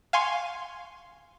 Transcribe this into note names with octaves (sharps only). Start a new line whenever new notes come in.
F5 G#5 C6 C#6